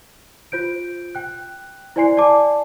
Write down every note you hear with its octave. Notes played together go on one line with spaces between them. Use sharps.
F4 C5 G6 D7
G5 F#6
E4 C5 D5 G#5 C6 C7
D5 G#5 A5 D6